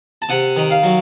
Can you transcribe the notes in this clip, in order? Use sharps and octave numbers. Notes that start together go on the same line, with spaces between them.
A5
C3 F#5
D#3
F5
F#3